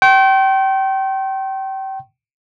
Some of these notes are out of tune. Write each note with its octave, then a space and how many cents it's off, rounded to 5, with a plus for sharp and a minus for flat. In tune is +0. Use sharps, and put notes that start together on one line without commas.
G5 -30 C6 +40